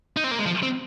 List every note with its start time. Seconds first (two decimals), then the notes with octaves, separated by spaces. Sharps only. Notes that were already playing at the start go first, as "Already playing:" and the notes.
0.17 D#4
0.24 C4
0.31 A#3
0.38 G#3
0.46 F3
0.63 C4